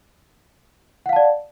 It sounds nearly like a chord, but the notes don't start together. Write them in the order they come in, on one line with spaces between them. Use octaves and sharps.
F#5 F5 A5 D5